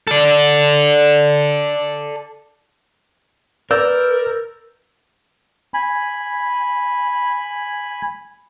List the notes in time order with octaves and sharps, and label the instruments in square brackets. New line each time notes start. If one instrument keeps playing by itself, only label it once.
[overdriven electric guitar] A4 D5
[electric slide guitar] A#4 [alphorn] B4 [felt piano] D5 E6 G6
[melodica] G#5 B5